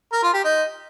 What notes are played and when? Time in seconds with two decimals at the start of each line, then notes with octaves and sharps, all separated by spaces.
0.12 A#4
0.23 F4
0.33 G4
0.44 D#4